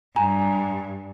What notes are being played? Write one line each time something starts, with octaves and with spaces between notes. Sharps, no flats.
G2 G#5 A#5